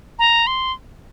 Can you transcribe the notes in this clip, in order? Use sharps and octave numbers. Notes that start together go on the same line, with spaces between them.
A#5
C6